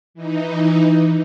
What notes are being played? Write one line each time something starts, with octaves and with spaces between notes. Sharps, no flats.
E3 D#4